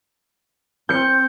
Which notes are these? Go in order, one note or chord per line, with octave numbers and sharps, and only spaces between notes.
C4 G6 C#7